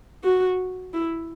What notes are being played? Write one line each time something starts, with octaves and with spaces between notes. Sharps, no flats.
F#4
E4